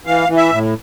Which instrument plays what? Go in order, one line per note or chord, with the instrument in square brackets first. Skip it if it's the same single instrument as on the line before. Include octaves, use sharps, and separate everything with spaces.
[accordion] E3 F5
E3
E5
A2